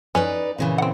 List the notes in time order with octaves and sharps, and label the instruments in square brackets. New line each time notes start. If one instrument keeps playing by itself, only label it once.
[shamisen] C#4 [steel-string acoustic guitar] D#4 B4 D5
[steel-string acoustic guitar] A#2 C#3 E3
[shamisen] C4 F#5